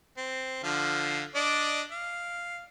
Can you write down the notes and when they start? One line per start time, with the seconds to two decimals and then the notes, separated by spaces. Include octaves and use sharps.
0.18 C4
0.64 D3 F3 F5
1.35 D4 D5 D#5
1.91 F5